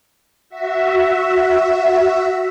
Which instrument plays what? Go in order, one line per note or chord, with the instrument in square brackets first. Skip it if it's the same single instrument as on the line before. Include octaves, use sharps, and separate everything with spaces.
[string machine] F#4 E5